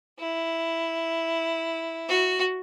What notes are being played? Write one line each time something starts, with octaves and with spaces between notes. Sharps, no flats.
E4
F#4